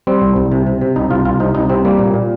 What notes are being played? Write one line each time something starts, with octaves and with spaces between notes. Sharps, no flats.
G3 C4
C2
C2
C3
C3
C3
C2 D#4
C2 F4
C2 F4
C3 D#4
C2 D#4
C3 C4
G3 A#3
A#2
A#2